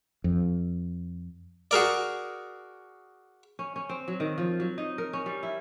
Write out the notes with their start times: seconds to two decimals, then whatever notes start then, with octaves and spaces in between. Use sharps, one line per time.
0.24 F2
1.71 F#4 G#4 A#4 D5
3.59 C#4
3.76 C#4
3.89 C4
4.08 F#3
4.20 D#3
4.38 F3
4.60 F#3
4.78 D#4
4.98 A#4
5.13 C#4
5.26 G3
5.43 E4